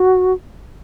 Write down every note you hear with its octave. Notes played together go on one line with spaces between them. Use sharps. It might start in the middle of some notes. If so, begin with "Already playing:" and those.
Already playing: F#4